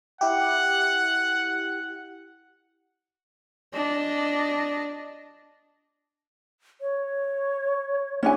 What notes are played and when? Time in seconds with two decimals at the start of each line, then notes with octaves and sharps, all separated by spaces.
0.21 E4 G4 F#5
3.74 D4 D#5
6.81 C#5
8.23 C#4 D4 E4 G#5